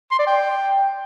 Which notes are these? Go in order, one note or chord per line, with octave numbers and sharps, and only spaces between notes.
C6
D5
G5